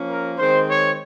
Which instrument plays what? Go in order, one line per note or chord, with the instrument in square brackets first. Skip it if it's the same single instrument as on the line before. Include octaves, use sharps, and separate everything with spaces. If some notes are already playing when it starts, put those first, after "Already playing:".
Already playing: [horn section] F3 A#3 C#4
A#4
D#3 G#3 C4 C5
C#5